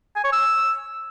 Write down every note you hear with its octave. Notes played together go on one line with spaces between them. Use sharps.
G#5
C#5
E6